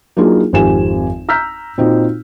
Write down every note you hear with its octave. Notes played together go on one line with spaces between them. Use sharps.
F#3 A#3 D4 D#4 F4 G#4
G#1 F2 G4 G#5 E7
A#5 E6 F6 G6 B6
A#2 C4 D#4 F#4